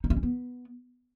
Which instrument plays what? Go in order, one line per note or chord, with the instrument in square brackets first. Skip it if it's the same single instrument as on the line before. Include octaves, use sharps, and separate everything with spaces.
[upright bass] D#4
E4
C#4
B3